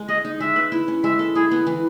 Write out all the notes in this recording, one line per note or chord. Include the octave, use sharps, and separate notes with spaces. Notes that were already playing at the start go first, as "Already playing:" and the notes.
Already playing: G#3
G#4 D#5
D#4
G#3 E5
B4
E4
C#4
G#3 E5
A4
E4 G#4
B3
E3